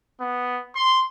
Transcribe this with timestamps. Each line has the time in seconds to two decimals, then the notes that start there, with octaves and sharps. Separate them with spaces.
0.20 B3
0.75 C6